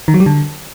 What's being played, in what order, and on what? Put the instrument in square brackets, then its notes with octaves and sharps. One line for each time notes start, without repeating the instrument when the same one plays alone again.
[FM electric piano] D#3
F#3
G3
D3